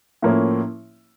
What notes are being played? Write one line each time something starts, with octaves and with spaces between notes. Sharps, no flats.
A2 F3 A#3 C#4 E4